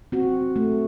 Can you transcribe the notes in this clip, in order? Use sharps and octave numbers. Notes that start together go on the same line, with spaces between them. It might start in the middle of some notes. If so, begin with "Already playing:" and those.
C4 F#4
A3